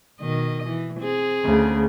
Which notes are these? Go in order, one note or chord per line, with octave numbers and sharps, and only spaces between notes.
B2 D#3 D#5
E3
C4 G#4
D2 C#3